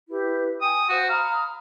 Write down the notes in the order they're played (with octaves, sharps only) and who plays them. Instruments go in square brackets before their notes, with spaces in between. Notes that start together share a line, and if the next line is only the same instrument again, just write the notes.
[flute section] E4 G4 B4
[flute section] G5 G#5 [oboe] D#6
[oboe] F#4 [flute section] C5 F5
[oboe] F5 [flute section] A#5 B5 D#6